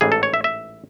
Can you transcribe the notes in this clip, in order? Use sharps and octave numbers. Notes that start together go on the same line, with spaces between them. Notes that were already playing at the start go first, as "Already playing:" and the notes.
A1 G#2 E3 G#4
A4
C#5
E5
E5